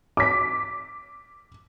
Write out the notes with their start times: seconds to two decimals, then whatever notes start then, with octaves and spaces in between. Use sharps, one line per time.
0.17 D6 B6